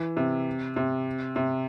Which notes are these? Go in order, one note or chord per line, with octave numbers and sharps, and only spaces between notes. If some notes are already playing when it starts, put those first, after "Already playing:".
Already playing: E3
C3
C3
C3